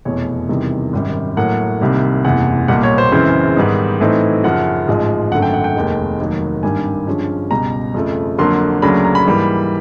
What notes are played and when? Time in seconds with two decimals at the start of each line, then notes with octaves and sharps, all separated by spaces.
0.05 F1 E2 B2 C#5
0.49 E2 C3 D#3 G3
0.93 G#1 F#2 D#3 G3
1.37 A2 F#3 A#3 F#5
1.81 C2 C3 D#3 G3 A#3
2.25 F#1 E2 C3 F#5
2.68 B1 A#2 G3 F#5
2.83 C#5
2.98 C5
3.12 F#2 C#3 E3 G#3 C4 C5
3.56 G#2 D#3 G3 B3 D#4
4.00 A2 E3 A3 C4 D#4
4.44 F#2 C#3 F3 F#5
4.88 A1 G#2 F3 G#3
5.32 G#1 F#2 D3 F#3 A3 F#5
5.42 G5
5.54 F#5
5.64 G5
5.75 F1 D#2 D#3 G#3
6.19 F1 D#2 D#3 F#3
6.63 G#1 G2 D#3 G3 A#3 G#5
7.07 G2 D3 F3 G#3 C#4
7.51 C#2 B2 G3 A#5
7.94 F2 C#3 F3 A3
8.39 F2 D3 F#3 A#3 C6
8.82 D2 C#3 F#3 A#3 D4 B5
9.05 A#5
9.15 B5
9.27 G#2 E3 G3 A#3